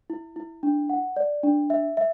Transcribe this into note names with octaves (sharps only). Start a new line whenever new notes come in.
E4
E4
D4
F#5
D5
D4
E5
E5